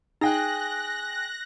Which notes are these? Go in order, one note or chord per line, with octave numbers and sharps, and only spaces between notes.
D#4 G#4 G5 F#6 A#6